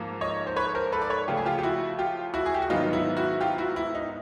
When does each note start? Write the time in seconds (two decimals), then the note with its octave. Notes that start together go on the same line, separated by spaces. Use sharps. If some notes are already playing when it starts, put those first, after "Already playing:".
Already playing: G#2 F3 A#3
0.21 C#5 D#5
0.47 C5
0.56 B4 C#5
0.75 A#4 C5
0.92 A4 B4
1.01 D5
1.10 B4 C#5
1.28 C#3 F3 A3 G4
1.37 G#4
1.46 F4 G4
1.59 G4
1.63 E4 F#4
1.99 F4 G4
2.34 E4 F#4
2.46 G#4
2.54 G4
2.62 F#4
2.70 G#2 D#3 F#3 B3 D#4 F4
2.93 E4
3.17 E4 F#4
3.41 F4 G4
3.58 E4 F#4
3.76 E4
3.95 D#4